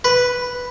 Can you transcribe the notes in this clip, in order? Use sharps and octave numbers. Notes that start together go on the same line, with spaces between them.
B4